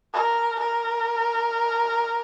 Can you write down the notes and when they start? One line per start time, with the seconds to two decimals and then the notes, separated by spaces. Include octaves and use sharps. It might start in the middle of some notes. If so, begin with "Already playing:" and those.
0.13 A#4
0.60 A#4